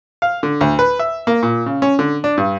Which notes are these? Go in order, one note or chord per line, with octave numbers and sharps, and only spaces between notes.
F5
D3
D2
B4
E5
A#3
A#2
C#3
C#4
D3
D4
G2